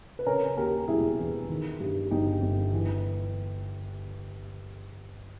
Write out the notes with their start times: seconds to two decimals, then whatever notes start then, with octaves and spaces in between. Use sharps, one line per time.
0.19 B4
0.26 C#3 A#4 C#5
0.57 D#2 G4 A#4
0.88 E1 E4 G#4
1.19 E3
1.50 D#3
1.80 G2
2.11 G1 D#4 G4
2.42 G1
2.73 E3